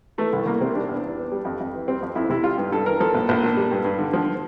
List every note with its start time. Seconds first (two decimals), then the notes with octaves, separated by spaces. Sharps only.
0.18 E3 A3
0.33 C2
0.46 C2 A#3
0.60 C3 C4
0.75 G3 D4
0.89 E2
1.03 E2
1.18 E3
1.32 G3
1.45 F2
1.60 F2
1.74 E3
1.88 G3 C4
2.02 F2
2.15 F2 E4
2.30 C3 E4
2.44 G3 F4
2.58 G2
2.72 G2 A4
2.86 E3 A#4
3.00 F3 A4
3.15 A#1
3.29 A#1
3.43 A#2
3.57 G3
3.71 G2
3.85 G2
3.99 D3
4.13 F3